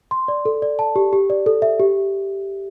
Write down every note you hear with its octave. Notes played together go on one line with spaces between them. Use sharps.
C6
D5
A4
D5
A5
G4
G4
D5
A4
E5
G4